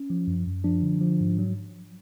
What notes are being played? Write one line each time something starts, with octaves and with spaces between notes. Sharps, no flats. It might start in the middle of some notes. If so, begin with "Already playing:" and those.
Already playing: C#4
F3
F#2
F#2
F3 D4
D3
F3
G#2
F#3